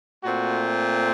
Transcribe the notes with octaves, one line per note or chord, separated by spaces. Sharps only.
A#2 A3 C4 F#4